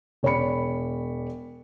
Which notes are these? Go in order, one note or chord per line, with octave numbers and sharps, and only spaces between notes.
E1 C#5 D5 B5 C#7